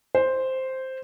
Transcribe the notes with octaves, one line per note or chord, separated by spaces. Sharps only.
C5